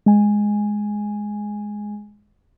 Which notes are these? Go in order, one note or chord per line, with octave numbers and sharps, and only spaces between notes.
G#3 G#5